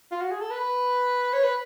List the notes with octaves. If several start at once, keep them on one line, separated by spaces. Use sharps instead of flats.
F4
F#4
G#4
A4
B4
C#5
B4